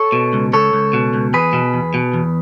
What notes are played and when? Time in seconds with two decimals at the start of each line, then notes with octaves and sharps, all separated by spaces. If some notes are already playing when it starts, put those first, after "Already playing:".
Already playing: A4 C#5
0.12 B2
0.33 C#2
0.53 C#2 A4 C#5
0.73 C#2
0.93 B2
1.14 C#2
1.33 E2 G#4 B4
1.53 B2
1.74 E2
1.94 B2
2.14 E2